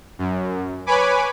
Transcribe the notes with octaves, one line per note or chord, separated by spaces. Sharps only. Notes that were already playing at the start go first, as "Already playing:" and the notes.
F#2
B4 C#5 G#5 B5 D6